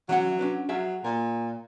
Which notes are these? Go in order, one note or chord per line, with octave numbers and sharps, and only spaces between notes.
E3 F#3 C#4 F#5
C#4 D4 B4
F#3 G#4 E5 F5
A#2 A#4